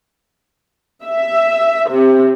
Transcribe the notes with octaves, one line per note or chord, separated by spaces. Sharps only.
E5
C3